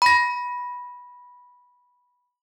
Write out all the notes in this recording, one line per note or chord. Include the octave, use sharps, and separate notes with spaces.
B5 A#6